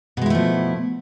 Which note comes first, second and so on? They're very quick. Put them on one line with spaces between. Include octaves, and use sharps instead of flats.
B2 G#3 E4 A3 F3